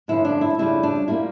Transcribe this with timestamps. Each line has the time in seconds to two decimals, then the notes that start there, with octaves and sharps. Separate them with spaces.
0.08 G2 D3 F3 C#4 E4
0.25 D4
0.41 E4
0.58 F2 C#3 G3 D4 E4
0.83 D4
1.08 A#2 G3 A#3 E4